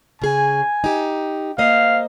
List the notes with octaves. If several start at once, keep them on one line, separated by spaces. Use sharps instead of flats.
C#3 G#4 G#5
D#4 G4
A#3 C5 D#5 F5